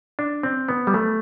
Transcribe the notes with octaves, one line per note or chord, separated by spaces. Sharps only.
D4
C4
B3
G3
A3